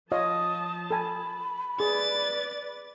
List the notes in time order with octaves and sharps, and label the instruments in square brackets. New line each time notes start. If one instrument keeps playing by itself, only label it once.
[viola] F3 A5 [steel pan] F4 C#5 D#5 [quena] D#6
[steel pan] A4 G#5 [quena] B5
[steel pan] G#4 [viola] B4 D5 [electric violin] A6